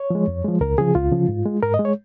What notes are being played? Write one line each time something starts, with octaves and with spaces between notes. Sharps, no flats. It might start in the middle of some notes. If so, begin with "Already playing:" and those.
Already playing: C#5
F3 G#3
F2
F3 G#3
C#2 A#4
C#3 F3 G#4
C#2 F4
C#3 F3
G#2
G#3
G#2 A#4
D#5
G#3
C#5